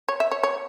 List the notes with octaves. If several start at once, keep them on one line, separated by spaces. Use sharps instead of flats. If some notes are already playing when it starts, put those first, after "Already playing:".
C#5
E5
C#5
C#5